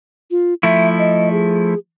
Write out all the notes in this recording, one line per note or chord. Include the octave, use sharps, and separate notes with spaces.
F4
F3 A3 E4 E5
D#5
G#4